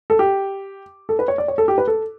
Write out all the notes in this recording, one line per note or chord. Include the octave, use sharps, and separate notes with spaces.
A4
G4
A4
B4
C#5
D5
C#5
A4
G4
B4
A4